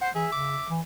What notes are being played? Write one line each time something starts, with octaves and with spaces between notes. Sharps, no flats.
C5 F#5
E3 G#4 E5
C#3 D6
E3